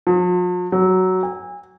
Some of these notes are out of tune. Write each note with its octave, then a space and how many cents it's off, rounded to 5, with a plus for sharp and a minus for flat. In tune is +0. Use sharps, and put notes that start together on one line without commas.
F3 +45
F#3 +10
G#5 -30